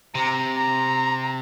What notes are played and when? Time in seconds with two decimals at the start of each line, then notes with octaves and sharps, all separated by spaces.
0.15 C3 A#5
0.57 A#5